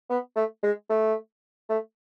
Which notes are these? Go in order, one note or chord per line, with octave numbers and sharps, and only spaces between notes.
B3
A3
G#3
A3
A3